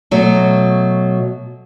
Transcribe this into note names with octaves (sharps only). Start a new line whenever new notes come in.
B2 F#3 A3